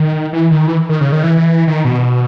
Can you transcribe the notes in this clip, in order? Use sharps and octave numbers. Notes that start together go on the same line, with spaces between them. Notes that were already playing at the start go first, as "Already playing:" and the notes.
Already playing: D#3
E3
D#3
E3
D#3
C#3
D#3
E3
D#3
B2